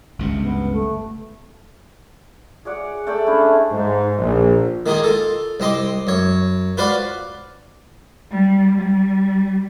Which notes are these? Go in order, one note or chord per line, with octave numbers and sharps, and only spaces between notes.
G1 C#2 C3
B3
A3
G#4 C#5 D5 F#5
A3 A4 D5 G5
C#4 D4 E4 C5
G#2
A#1
D#3 A#3 D#4 F4 G#4
F4 A4
C2 C4 D#5 C6 D6
F#2 C#5
F4 F#4 B4 C5 D5 F5
G3
G3